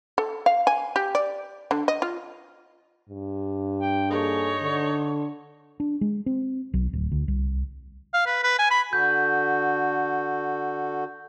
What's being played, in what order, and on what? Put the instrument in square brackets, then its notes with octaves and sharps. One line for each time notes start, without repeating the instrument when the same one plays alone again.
[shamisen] A4
F5
G#5
G4
D5
D3
D#5
F4
[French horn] G2
[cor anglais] G5
[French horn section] A#3 G#4 A4 [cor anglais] D#4 [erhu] C#5
[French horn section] D3
[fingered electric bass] D4
G#3
C4
B1
D1
D2
C2
[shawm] F5
B4
B4
G#5
B5
[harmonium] D3 F#4 A4 [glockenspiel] G6